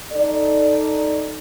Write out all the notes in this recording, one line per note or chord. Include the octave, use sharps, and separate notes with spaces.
D#4 A4 D5